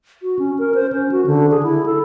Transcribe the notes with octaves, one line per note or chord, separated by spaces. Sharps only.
F#4
C#4
A#4
C5
C#4
F#4
D3
G#4
E4
A4